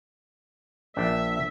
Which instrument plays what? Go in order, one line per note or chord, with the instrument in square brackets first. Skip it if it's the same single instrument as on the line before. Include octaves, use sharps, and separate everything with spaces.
[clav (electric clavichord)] A#1 D4 G5 [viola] E5